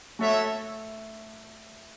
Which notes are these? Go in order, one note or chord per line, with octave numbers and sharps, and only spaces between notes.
A3 F#4 A4 C#5 E5